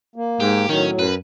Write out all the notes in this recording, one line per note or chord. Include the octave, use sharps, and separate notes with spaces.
A#3
G#2 G4
A2 D#3 F#3 C#4
F#2 B4